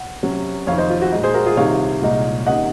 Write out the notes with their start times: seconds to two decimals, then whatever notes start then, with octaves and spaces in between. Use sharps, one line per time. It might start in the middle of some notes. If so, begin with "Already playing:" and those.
Already playing: F#5
0.23 C3 F#3 C#4
0.67 F2 C3 D#3 C#5 F5
0.78 C5 D#5
0.90 F4
1.02 F#4
1.12 A#2 G#3 D#4
1.23 G#4 C5
1.34 F#4 A#4
1.46 F4 G#4
1.57 C2 C3 D#3 C#5 F5
2.02 C2 A#2 G#3 D#4
2.46 C3 D#3 A#3 C#4 D#5 F#5